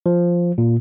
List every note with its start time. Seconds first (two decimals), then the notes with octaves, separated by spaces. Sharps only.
0.06 F3
0.58 A#2